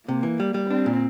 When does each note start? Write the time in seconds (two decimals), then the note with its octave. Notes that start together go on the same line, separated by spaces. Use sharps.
0.08 C3 A#3
0.23 E3
0.40 G3
0.54 G3
0.70 C4 D4
0.86 A#2